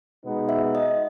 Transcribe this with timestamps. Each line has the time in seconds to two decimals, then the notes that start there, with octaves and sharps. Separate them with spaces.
0.24 B2 G#3 B3 D#4
0.49 E5
0.75 D#5